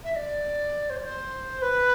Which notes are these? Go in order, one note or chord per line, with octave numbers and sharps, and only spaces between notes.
E5
D5
C5
D5
C5
B4